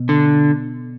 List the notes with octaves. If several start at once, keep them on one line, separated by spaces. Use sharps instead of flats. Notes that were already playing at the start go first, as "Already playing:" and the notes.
Already playing: B2
D3